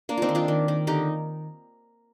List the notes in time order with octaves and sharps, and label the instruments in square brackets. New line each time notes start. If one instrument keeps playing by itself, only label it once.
[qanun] A#3 D4
C4 D#4 F4
D#3
D4 F4
D#3
D#3
D3 D#4 G4